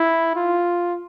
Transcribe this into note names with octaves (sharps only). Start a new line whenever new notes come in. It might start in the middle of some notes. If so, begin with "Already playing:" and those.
Already playing: E4
F4